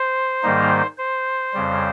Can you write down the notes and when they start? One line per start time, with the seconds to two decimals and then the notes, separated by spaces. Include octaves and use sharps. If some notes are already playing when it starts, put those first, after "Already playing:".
Already playing: C5
0.43 G#2 D#3 G3 A#3 D#4
0.98 C5
1.54 F2 C#3 G3